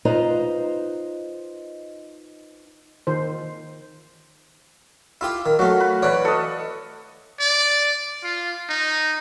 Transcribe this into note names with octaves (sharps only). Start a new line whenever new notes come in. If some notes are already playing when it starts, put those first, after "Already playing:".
D#4 F4 B4 C5 D#5 A#5
D#3 C5
E4 F4 G4
D#3
F#3 A3 F#4 F5
B4
E3 B4 C#5 D5
A4 D#5
D5
F4
D#4